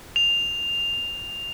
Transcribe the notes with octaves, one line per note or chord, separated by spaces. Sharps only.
F7